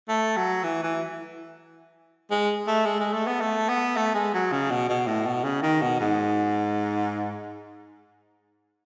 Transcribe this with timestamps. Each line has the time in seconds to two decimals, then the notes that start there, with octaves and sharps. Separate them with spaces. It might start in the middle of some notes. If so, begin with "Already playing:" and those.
0.09 A3
0.37 F#3
0.64 E3
0.83 E3
2.31 G#3
2.67 A3
2.86 G#3
3.00 G#3
3.13 A3
3.27 B3
3.41 A3
3.69 B3
3.96 A3
4.15 G#3
4.34 F#3
4.52 C#3
4.71 B2
4.89 B2
5.07 A2
5.26 B2
5.44 C#3
5.63 D#3
5.81 B2
5.99 G#2